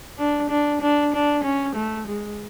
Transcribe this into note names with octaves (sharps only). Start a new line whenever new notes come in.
D4
D4
D4
D4
C#4
A3
G#3